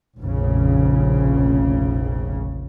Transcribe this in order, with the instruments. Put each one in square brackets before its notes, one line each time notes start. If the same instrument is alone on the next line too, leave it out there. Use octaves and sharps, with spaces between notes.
[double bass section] F1 A#1 C#3